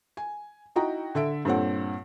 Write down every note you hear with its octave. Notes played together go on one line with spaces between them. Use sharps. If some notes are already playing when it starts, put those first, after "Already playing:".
G#5
D#4 E4 F#4 G5 A#5
D3 A4 E5 D7
G2 A#2 C4 A4 C#5 F#5